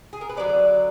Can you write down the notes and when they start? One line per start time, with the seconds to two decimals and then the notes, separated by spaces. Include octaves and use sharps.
0.13 G#4
0.21 A#4
0.29 B4
0.37 D3 F#3 B3 D5